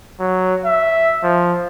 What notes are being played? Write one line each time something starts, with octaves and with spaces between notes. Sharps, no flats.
F#3
E5
F3